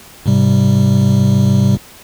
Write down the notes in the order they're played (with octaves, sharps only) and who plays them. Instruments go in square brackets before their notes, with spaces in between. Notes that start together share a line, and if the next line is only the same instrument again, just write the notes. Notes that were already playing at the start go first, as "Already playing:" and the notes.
[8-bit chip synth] G#2 C3 G3